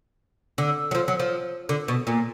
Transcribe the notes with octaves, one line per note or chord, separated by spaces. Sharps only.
D3
F#3
F3
F#3
F3
D3
B2
A#2